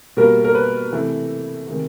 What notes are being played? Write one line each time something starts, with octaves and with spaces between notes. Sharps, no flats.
B2 G3 A#3 A#4
A#4
B4
C3 E3 A3
C3 D#3 G#3